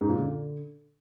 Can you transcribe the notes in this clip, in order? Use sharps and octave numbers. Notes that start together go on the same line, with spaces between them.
G#2
A#2
D3